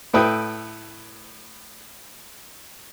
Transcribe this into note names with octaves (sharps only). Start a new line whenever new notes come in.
A2 A4 B4 E5 G5 D#6